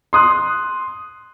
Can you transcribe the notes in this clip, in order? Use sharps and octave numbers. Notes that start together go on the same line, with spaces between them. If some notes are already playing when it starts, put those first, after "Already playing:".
C6 D#6 F#6